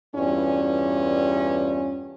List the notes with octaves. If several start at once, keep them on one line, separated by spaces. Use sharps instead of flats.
E2 G2 C#4 E4 F4 D5